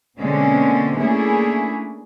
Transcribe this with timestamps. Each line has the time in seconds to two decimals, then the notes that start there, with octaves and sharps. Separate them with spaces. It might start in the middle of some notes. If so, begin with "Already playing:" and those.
0.19 B2 D3 G#3 A#3 C4 C#4
0.99 A3 A#3 C#4 D4 E4 G#4